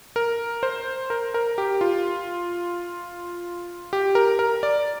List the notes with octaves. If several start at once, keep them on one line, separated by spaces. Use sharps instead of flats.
A#4
C5
A#4
A#4
G4
F4
G4
A#4
A#4
D5